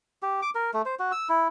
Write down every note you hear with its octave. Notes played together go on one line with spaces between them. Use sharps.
G4
D6
A#4
A3
C5
F#4
E6
E4